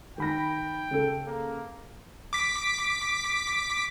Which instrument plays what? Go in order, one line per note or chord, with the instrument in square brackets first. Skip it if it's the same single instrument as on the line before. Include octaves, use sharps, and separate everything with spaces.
[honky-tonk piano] D#3 B5 A#6 [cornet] G5
[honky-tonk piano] C#3 A4
[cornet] A#3
[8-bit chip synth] D6 B6